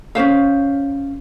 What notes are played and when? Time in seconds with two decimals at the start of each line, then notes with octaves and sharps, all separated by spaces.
0.15 C#4 D4 C5 F5